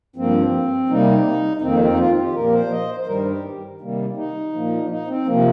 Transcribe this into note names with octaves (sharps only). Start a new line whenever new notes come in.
G2 F3 A#3 C4
C3 G3 A#3 D#4
D#4
F2 D#3 A#3 C4
C4
D#4
F4
G4
A#2 F3 A#3 A#4
C5
D#5
C5
C5
G2 D#3 G3 A#4
G4
C3 D#3 G3 A#3
D#4
A#2 F3 A#3
D#4
C4
C3 F3 A#3